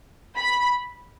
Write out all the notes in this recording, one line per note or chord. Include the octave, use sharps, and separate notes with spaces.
B5